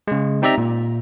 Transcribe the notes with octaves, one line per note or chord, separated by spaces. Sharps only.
C#3 G#3
C4 D#4 G4 D5 E5 A#5
A#2